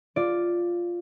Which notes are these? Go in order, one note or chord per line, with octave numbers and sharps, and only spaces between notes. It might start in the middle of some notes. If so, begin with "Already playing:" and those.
F4 D5